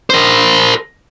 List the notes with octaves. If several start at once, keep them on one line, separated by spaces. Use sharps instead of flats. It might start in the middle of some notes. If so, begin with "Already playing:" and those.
A#4 C5